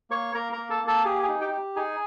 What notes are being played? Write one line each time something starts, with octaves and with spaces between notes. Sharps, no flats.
A#3 C#5 C#6
A#3 A#4 A#5
A#4 A#5
A#3
A4 A5
A#3
A4 A5
G4 G#4 G#5
G#4 G#5
D#4
G4 G5
G4
D#4 G#4 G#5